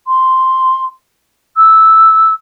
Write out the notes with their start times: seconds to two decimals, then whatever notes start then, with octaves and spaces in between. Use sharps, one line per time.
0.07 C6
1.56 E6